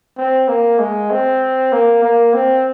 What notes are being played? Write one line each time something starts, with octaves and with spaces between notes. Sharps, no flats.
C4
A#3
G#3
C4
A#3
A#3
C4